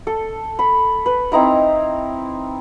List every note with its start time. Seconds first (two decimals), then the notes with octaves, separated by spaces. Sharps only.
0.07 A4
0.59 B5
1.06 B4
1.32 C4 D#4 E4 A#5